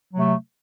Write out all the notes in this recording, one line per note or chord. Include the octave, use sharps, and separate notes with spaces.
C3 F#3 A3